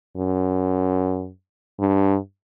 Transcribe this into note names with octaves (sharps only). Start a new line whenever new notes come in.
F#2
G2